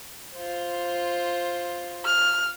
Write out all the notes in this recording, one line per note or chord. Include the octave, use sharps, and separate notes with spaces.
F4 C5
F6